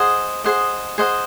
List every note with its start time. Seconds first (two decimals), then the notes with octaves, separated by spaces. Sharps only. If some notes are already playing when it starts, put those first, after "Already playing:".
Already playing: G#4 C5 D#5 F#5
0.44 G#4 C5 D#5 F#5
0.98 G#4 C5 D#5 F#5